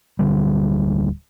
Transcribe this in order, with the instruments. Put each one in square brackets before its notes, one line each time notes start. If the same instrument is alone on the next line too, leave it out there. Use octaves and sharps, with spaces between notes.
[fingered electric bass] D1 D3 G3